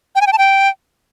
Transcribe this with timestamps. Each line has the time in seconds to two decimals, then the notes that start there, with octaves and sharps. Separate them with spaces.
0.15 G5
0.21 G#5
0.27 G5
0.33 A5
0.38 G5